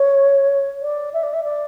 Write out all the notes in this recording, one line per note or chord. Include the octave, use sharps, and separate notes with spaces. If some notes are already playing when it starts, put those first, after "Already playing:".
Already playing: C#5
D5
E5
D5
E5
D5